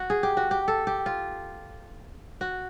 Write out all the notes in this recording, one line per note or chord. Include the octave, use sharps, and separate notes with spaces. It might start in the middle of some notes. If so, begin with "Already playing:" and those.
Already playing: F#4
G#4
G4
F#4
G4
A4
G4
F4
F#4